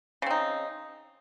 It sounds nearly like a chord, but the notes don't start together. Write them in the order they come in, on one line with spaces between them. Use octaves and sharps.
C#3 C4 D#4